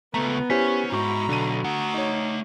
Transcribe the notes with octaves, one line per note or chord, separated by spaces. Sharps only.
C#2 A3 B3 A#5
C#4 E4 G4 C5 C#5 G#5 B6
G#2 F#4 A#5 B5 C#6
B1 D3 D#7
A3 F#5 A#5
D#4 C#5